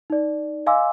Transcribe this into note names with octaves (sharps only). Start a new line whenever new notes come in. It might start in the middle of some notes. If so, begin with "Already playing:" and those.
D#4 D5
D#5 F5 G#5 C6 D6 E6